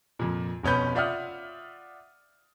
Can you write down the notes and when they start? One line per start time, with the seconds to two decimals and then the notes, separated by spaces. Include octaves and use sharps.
0.19 F2 A#2
0.63 F1 B2 C#4 B4 G6
0.95 F4 D5 E5 F#5 D#6 F6